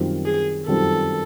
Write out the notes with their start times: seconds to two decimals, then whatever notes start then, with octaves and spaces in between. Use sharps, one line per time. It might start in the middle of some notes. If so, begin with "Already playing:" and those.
Already playing: F#2 D#3 G3 C4 F4
0.25 G#4
0.67 F#2 D#3 G3 C4 F4 A4